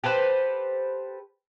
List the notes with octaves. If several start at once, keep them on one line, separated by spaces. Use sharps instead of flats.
G4 A4 B4 C5